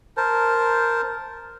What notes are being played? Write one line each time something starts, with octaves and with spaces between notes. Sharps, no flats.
A#4 C5 A5